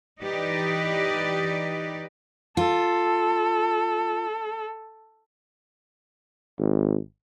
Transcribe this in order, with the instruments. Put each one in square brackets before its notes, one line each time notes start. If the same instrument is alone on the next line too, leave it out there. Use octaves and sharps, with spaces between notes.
[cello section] E3 D#4 G4 B4 D5 D#5
[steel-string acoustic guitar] F4 [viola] A4
[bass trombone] G#1